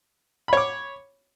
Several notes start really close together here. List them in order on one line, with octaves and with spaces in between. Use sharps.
B5 C#5 D6